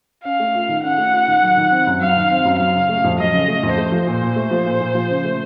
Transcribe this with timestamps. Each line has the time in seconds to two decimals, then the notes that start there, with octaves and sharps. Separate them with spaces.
0.24 C#4 F5
0.39 A3
0.54 F4
0.69 D#3
0.83 C#4 F#5
0.98 A3
1.13 F4
1.28 D#3
1.42 F#3
1.57 D#3
1.71 C4
1.87 F#2
2.01 F#3 F5
2.16 D#3
2.30 C4
2.45 F#2
2.59 F#3 F5
2.75 C#3
2.89 A3
3.04 F2
3.19 F#3 D#5
3.33 C#3
3.48 A3
3.63 F2
3.78 A3 C5
3.92 F3
4.07 A#2
4.22 A#2
4.36 A3
4.51 F3
4.66 A#2
4.80 A#2
4.95 F3
5.10 C#3
5.25 A3